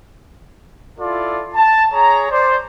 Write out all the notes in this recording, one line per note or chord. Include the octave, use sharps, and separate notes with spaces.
E4 F4 A4 D5
A5
G#4 C#5 A#5
C5 D5